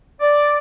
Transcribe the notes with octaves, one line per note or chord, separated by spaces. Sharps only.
D5